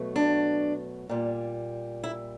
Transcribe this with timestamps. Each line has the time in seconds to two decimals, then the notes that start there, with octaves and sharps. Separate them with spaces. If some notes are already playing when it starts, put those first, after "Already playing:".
Already playing: B2 F#3 A3
0.16 D4
1.09 A#2 G3
2.04 E4